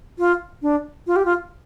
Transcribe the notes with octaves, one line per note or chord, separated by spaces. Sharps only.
F4
D4
F4
G4
F4